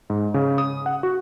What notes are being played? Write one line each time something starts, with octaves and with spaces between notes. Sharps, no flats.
G#2
C#3
D#6
F#5
F#4